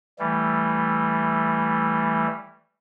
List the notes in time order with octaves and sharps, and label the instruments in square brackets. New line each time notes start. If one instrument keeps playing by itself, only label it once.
[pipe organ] E3 G3 A3